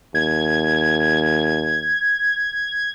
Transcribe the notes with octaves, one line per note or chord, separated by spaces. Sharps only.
D#2 G#6